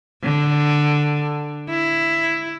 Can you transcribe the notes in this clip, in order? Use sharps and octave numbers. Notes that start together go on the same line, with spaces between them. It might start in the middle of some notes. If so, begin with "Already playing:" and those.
D3
E4